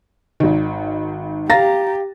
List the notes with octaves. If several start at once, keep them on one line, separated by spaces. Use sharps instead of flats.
G#1 D#3
G4 F5 A#5 A6 A#6